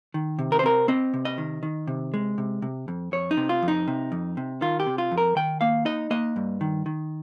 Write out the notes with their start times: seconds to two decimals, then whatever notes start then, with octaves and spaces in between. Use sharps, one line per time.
0.14 D#3
0.39 C3
0.52 A#4
0.59 C5
0.63 C4 A#4
0.88 C4 D#5
1.14 C3
1.25 D#5
1.38 D#3
1.63 D#3
1.87 C3
2.14 G#3
2.38 C3
2.62 C3
2.88 F2
3.12 F2 C#5
3.31 D#4
3.37 C3
3.49 F4
3.62 F2
3.68 D#4
3.88 C3
4.12 F2
4.37 C3
4.61 D#3 F4
4.80 G4
4.87 C3
4.98 F4
5.12 F2
5.18 A#4
5.36 D#3 G5
5.61 A#3 F5
5.85 D#4 D#5
6.11 A#3 D#5
6.36 G2
6.61 D#3
6.86 D#3